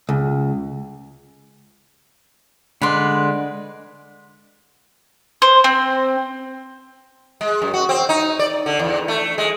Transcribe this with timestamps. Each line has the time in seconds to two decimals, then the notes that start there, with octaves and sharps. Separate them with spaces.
0.09 C#2
2.82 D3 G#3 B4 D5 C6
5.42 C5
5.64 C4
7.41 G#3
7.62 F#2
7.73 F#4
7.89 C4
8.09 D#4
8.39 D5
8.66 D3
8.79 E2
9.08 A3
9.38 G#3